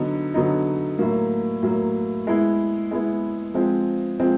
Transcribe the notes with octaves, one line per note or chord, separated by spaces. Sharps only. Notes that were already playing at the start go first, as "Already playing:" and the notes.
Already playing: D3 F#3 B3 D#4
D3 F#3 B3 D#4
A2 F#3 A#3
A2 F#3 A#3
G#3 B3 E4
G#3 B3 E4
F3 G#3 C4
F3 G#3 C4